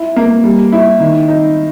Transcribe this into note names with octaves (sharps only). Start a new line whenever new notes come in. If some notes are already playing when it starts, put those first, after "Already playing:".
Already playing: E4
A#3
G3
E4
D#3
D#4